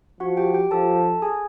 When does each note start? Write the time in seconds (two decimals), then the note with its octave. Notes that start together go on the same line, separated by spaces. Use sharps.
0.20 F3 F#4 F#5
0.37 G4 G5
0.54 G4 G5
0.71 F3 A4 A5
1.22 G#4 G#5